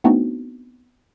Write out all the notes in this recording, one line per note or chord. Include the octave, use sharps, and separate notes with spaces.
A3 B3 C4 D4 D#4 F#4